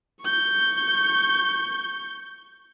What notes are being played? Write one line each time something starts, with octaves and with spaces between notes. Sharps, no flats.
C#6 G6